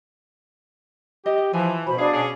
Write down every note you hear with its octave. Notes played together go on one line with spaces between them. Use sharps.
G4 D#5
D#5
E3 F3 G#5
B2 F#4 C5 B5
D4 G#4 F5
C#4 G#4